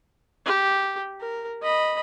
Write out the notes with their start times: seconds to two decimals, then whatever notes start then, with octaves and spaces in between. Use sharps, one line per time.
0.46 G4
1.20 A#4
1.62 D#5 B5